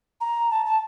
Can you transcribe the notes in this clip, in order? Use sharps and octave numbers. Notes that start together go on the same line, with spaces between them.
A#5
A5
A5